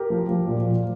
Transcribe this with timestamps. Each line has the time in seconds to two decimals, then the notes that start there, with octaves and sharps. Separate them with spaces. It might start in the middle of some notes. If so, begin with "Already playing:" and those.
Already playing: G4 A#4
0.10 F3
0.29 F3
0.47 A#2
0.67 F3